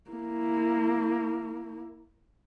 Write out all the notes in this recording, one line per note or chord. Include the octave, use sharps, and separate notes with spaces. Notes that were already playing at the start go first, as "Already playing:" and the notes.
A#3 E4